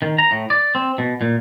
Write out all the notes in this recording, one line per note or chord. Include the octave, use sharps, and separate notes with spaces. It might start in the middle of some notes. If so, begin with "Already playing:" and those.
D#3
A#5
A2
D5
C4
B2
A#2